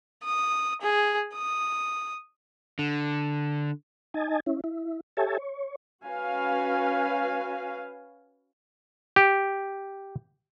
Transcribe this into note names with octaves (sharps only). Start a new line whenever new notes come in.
D#6
G#4
D#6
D3
D#4 D#5 G#5 A5
C#4 E4
E4
G4 A4 C#5 E5 G#5 A5
C#5
C#4 F#4 B4 F5 G#5
G4